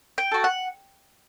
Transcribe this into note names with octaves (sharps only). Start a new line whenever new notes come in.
G5
F#4 A4
F#5